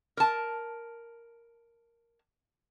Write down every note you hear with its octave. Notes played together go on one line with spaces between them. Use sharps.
A#4 A5